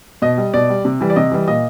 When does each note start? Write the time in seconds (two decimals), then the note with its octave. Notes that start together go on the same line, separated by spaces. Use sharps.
0.22 B2 D#5
0.37 G3
0.54 B2 D5
0.69 G3
0.85 C3
1.01 E3 G3
1.10 D5
1.16 C3 D#5
1.32 E3 G3
1.48 A#2 D#5